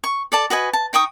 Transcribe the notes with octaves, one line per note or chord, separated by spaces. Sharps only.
C#6
A4 D5 A5
F#4 B4 D#5 G#5
A5
D#4 G5 C#6 D#6